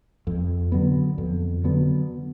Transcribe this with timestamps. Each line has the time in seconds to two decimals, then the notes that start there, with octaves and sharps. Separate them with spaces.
0.27 F2
0.72 D3 F#3 B3
1.18 F2
1.64 D3 F#3 B3